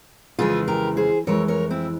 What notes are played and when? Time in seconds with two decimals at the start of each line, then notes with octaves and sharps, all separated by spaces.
0.39 F2 C#3 E3 G#3 F4 G#4
0.68 G4 A#4
0.97 G#4 C5
1.27 F2 E3 G#3 A#4 C#5
1.48 A#4 C#5
1.70 C4 E4